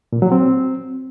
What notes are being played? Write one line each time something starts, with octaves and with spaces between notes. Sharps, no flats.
A#2
F#3
C4